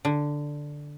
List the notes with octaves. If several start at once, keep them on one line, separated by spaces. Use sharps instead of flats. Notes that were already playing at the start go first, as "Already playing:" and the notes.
D3